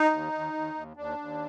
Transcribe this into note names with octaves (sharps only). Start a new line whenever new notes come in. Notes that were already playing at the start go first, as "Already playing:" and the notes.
Already playing: D#4
D#2
D#2
D#2
D#2
D#2 D4
D#2